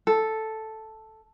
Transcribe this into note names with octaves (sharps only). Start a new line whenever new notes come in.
A4